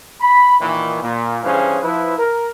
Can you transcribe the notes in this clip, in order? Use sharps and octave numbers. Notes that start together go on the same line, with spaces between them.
B5
A#2 D#3 E3
A#2
G2 E3 C#4 G#4 C5 F5
F3 E4 B4
A#4